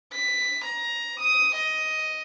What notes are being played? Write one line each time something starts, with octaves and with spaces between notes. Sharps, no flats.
B6
A#5
D#6
D#5